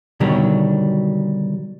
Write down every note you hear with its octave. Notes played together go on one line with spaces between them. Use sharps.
B2 D3 D#3 F#3 G3